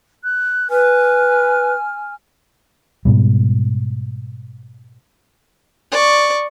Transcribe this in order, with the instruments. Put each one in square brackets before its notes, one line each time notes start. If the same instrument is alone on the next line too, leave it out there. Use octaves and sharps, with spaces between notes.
[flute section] F#6
[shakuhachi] B4 [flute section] G#5 F6
[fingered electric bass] G#2 B2 G3
[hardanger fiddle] D5 C#6